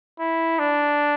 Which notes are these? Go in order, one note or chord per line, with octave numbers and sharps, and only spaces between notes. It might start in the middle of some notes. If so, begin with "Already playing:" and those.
E4
D4